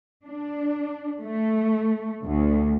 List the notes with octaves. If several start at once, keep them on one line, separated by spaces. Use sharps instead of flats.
D4
A3
D2